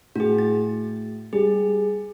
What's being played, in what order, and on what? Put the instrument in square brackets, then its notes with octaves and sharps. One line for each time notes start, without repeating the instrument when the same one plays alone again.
[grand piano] A2 [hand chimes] F#4 G#4
[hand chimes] A6
[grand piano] G3 [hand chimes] G#4